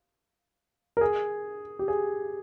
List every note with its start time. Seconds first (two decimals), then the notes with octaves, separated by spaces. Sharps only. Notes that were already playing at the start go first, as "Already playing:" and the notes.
0.97 A#4
1.01 G#4
1.79 G4
1.88 G#4